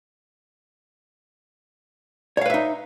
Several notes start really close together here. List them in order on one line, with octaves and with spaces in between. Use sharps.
C#5 F5 B4 E5 D#4